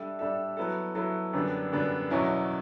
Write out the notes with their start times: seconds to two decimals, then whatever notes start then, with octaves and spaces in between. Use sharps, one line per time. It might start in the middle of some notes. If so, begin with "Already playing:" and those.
Already playing: G3 D4 A4 E5
0.19 G3 D4 A4 E5
0.57 F#3 B3 E4 A4
0.95 F#3 B3 E4 A4
1.33 F#2 D3 G3 B3 D4
1.72 F#2 D3 G3 B3 D4
2.10 E2 B2 F#3 C#4 E4